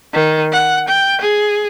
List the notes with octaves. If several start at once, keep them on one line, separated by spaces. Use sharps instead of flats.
D#3
F#5
G5
G#4